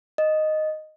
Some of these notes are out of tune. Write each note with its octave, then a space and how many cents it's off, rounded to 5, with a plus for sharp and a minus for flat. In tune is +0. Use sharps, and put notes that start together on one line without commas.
D#5 -5